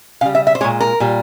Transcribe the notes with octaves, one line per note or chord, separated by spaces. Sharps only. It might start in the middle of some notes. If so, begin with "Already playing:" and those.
C#3 G3 F5
E5
E5
C5
A#2 G#3 C#5
A#4
A#2 G3